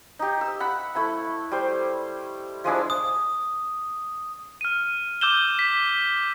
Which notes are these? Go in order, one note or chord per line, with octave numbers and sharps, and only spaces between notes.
D#4 G4
E6
F#5 B5
A3 E4 B5
G3 C5
F3 G#3 D4 E4
D#6
F6 D#7
D6 E6 G6 E7 G7
B6